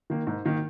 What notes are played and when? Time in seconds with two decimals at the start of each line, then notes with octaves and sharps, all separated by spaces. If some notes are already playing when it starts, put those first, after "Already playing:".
0.10 D#3 A#3
0.27 G#2
0.45 D#3 A#3